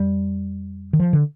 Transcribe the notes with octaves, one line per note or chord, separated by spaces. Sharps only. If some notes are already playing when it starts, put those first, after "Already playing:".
Already playing: F2 G3
D#3
F3
D3